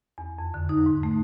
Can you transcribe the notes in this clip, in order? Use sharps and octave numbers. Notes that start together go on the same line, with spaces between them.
E2
F2
D3
D#4
G#2
A3